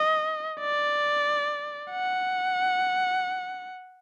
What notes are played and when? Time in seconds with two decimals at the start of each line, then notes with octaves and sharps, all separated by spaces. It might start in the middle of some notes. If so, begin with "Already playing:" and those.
Already playing: D#5
0.60 D5
1.91 F#5